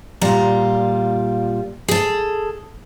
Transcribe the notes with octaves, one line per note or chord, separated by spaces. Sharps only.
A#2 G3 F4 A#5
G#4 A4